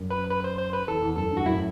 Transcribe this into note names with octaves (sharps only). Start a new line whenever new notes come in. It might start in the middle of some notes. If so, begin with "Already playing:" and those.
Already playing: F#2
B4
B4
C5
C5
B4
E2 A4
E2
F#2 A4
E2 G2
F#4
F#2 A2 E4